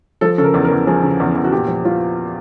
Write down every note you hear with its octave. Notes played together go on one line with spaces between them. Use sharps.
F3 A4
C#3 A4
A#4
E2
A#4
E2
F3 G#4
C#3
E2
E2
F#4
A#2 G4
F3
F3 F4